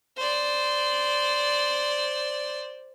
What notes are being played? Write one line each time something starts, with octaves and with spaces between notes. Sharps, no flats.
C5 D5